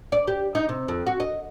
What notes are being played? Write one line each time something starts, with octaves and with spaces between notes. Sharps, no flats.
D5
G4
D#4
C3
F2
F#4
D#5